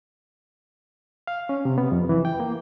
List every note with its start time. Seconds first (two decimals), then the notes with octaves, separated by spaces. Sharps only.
1.27 F5
1.49 C#4
1.65 C3
1.78 B3
1.92 F2
2.09 E3
2.25 G5
2.40 A#3